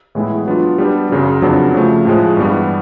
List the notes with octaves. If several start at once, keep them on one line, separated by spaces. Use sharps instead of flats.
A2 E3 G#3 B3 E4
F#3 B3 D4 F4
G3 B3 D4 G4 B4
F#2 C#3 F#3
F2 C#3 F#3 B3 D4
C#3 F3 A3
A2 F3 G#3
G2 E3 G3 B3